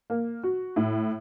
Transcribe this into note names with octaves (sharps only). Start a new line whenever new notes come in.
A#3
F#4
A2